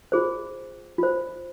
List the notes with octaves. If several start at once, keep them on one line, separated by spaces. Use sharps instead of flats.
F4 G#4 C5
F4 C5